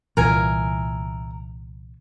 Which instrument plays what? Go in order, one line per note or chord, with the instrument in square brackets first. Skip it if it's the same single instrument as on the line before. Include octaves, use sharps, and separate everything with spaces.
[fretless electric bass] C2 A#2 E3 [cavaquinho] A#4 E5 G#5